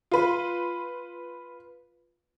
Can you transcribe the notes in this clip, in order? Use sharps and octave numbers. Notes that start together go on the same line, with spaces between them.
F4 B4